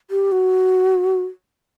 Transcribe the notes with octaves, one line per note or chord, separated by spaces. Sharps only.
G4
F#4